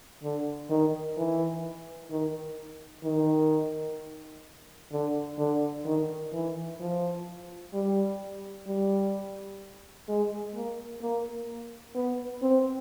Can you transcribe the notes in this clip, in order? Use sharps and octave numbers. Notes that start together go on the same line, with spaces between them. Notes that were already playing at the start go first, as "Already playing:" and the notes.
D3
D#3
E3
D#3
D#3
D3
D3
D#3
E3
F3
G3
G3
G#3
A#3
A#3
B3
C4